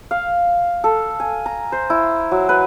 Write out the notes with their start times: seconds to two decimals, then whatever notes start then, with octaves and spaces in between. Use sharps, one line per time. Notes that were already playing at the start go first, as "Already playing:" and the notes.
0.11 F5
0.84 A4
1.20 G#5
1.46 A#5
1.72 C5
1.90 E4
2.31 F#3
2.49 B4